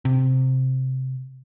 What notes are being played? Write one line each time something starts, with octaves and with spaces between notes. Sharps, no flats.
C3